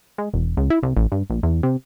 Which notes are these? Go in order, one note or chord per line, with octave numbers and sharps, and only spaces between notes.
G#3
E1
C#2
E4
C2
A1
G2
A#1
E2
C3